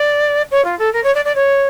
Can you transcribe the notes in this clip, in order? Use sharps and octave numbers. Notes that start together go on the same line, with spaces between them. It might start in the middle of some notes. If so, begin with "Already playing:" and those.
Already playing: D5
C#5
F4
A4
A#4
C#5
D5
D5
C#5